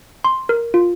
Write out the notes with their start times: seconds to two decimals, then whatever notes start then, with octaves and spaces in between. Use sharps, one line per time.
0.24 C6
0.49 A#4
0.74 F4